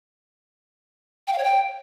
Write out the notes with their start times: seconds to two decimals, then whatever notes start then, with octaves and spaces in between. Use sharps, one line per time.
1.27 G5
1.33 F5
1.38 C#5
1.44 G5